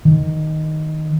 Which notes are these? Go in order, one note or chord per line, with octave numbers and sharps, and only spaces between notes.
D#3